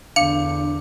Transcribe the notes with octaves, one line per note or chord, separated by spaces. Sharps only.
E2 D3 D4 F5 C#7